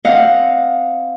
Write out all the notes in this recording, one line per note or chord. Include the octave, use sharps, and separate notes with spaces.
C4 D#5 F5 F#5